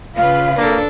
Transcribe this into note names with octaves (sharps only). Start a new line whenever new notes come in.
C#3 F4 B4 F5
A#3 D4 A4